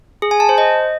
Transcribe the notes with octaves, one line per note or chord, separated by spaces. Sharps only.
G#4
G#5
A5
C5
D#5